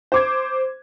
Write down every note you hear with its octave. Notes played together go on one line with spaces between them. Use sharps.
C5 D6 G#6